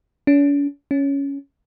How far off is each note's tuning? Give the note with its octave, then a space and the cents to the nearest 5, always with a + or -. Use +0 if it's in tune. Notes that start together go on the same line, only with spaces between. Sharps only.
C#4 +45
C#4 +5